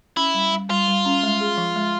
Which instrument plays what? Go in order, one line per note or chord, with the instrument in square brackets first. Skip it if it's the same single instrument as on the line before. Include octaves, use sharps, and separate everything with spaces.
[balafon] C#4 [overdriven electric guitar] E4
[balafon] G3
G3
[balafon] G3 [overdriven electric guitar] F4
[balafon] G3
C#4
G#3
G#4
F3
G#3